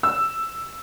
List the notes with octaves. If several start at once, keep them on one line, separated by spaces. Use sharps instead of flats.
E6